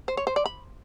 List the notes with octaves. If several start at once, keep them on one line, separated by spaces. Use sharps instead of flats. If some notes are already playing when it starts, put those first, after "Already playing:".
C5
C#5
C5
D5
B5